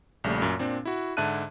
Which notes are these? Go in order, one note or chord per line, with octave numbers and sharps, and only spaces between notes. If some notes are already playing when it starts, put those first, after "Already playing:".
A#1 C#3 G3 A3
F#2 A#2
A#2 C4 D4
E4 F#4
G#2 D3 E5 A5 F#6 D#7